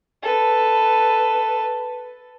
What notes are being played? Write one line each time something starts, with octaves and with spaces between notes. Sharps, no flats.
A4 B4